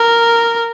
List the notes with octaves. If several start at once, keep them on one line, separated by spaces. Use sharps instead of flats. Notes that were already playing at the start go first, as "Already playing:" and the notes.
Already playing: A#4